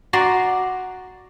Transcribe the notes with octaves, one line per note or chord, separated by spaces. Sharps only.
F#4 D5 A#5 C6